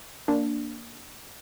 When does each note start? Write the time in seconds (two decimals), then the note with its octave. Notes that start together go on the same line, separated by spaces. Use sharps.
0.28 A#3 D4